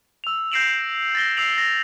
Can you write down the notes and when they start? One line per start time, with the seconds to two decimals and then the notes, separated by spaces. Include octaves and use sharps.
0.24 E6 F7
0.52 G6 A#6 C7 D7 E7 F#7
1.15 A6 A#6 G7
1.37 E6 C7 D7 F7 F#7
1.58 A#6